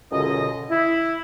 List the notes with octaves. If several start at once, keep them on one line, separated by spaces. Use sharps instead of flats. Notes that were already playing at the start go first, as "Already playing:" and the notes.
C#2 F#2 B2 D3 C#4 D#5
E4